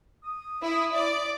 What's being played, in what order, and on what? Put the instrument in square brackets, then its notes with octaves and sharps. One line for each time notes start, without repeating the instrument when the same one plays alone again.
[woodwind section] D#6
[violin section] E4 E5
D5